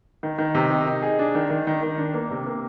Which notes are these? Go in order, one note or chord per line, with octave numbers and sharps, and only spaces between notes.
D#3
D#3
C3
D#4
D#4
G#4
D4
D#3
D#3
D#3
D#3
D4
A#3
C3
A#3